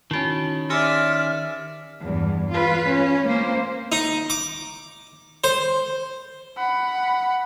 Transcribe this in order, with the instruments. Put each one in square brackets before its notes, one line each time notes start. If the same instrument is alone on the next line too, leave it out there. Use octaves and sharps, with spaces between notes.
[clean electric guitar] D#3 C#4 [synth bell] E4 F#4
[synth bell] G4 G#5 E6 [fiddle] D5 E5 [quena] F6
[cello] E2 G2
F4 B4
C#4
A#3 C5
[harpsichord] D#4
D6
C5
[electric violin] F#5 B5